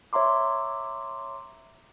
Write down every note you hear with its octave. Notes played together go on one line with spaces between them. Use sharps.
C#5 E5 A#5 C6 D6